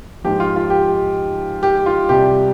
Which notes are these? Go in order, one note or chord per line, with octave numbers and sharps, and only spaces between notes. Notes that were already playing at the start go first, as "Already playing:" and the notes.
G#2 F3 G4
F4
F4
G4
G4
F4
C2 C3 G3 G4